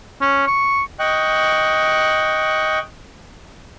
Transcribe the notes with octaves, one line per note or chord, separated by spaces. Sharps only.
C#4
C#6
D#5 G5 C#6 F#6